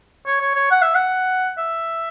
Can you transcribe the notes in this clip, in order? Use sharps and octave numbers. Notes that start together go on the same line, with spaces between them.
C#5
C#5
C#5
F#5
E5
F#5
E5